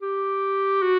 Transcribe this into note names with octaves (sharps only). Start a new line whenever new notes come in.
G4
F#4